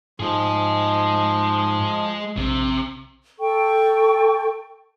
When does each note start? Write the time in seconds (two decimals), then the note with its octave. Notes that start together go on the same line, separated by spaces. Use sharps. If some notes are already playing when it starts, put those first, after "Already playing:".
0.20 G#2 F3 G#3 G#4
2.37 A#1 C3
3.39 A4 G5 C#6